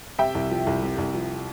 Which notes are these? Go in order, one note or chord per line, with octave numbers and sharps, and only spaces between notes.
C3 E5 G5
C2
F3
C2
C3
C2
F3